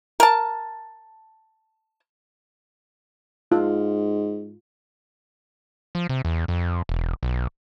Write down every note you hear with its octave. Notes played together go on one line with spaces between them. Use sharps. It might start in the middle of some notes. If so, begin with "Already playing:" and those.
A#4 A5
G#2 F4
F3
C3
E2
F2
E1
B1